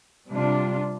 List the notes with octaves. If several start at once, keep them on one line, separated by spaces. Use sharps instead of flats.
C3 G3 D4 F4